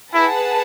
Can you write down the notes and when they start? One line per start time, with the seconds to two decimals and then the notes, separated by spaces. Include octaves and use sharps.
0.13 E4 G#4 B4 F#5 A5